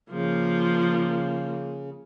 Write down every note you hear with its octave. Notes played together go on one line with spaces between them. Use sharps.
C#3 F3 A#3